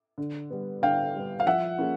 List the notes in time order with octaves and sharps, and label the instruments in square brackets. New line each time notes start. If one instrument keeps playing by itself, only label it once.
[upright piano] D3
G3 B3
[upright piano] D3 [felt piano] F5 G5
[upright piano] G3 B3
[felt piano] F5
[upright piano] F3 [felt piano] E5 F#5
[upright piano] A#3 C#4 F4 G#4